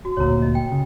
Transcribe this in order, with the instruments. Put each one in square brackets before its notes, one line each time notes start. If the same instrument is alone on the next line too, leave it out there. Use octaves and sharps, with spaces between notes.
[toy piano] F#4
[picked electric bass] G1 D2 A#2 [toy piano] C#5 A#5
[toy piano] D#5
G5
[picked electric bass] C#3